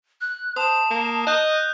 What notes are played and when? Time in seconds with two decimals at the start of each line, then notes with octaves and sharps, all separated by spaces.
0.21 F#6
0.56 C5 A5 D#6
0.91 A#3
1.27 D#5 F#6 G6